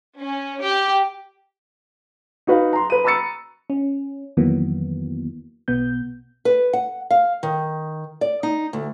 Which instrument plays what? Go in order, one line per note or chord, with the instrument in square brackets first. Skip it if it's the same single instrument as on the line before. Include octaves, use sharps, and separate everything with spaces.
[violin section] C#4
G4
[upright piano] D#4 F#4 B4 F5
A#5 C6
B4 D#7
A#5 B5 C#6 E6 A6 C#7
[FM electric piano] C#4
F2 D#3 E3 F#3 A#3 B3
B1 B2 B3 G6
[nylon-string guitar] B4
F#5
F5
D#3
D5
D#4
D2